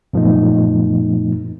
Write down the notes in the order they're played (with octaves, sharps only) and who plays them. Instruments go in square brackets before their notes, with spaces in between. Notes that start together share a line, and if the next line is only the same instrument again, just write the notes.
[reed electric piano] F#2 A#2 F3 A3 B3 D#4